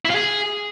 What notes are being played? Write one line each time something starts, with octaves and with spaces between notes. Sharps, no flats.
E4
F4
G#4